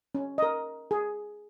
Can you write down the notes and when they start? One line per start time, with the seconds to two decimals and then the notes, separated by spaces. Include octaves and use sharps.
0.15 C#4
0.38 A#4 D#5
0.91 G#4